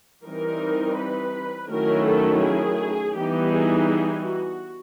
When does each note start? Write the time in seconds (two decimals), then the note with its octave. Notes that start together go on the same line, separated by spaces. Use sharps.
0.25 E3 G3 C4 D#4 A#4
0.97 B4
1.70 D#3 F#3 A3 C#4 E4 A#4
2.06 A4
2.43 G#4
3.16 E3 G3 B3 D#4 G4
3.52 G#4
3.88 G#4
4.25 F#4